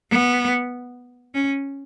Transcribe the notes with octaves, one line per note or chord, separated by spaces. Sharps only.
B3
C#4